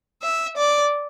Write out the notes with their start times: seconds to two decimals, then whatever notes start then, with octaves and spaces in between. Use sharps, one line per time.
0.21 E5
0.56 D5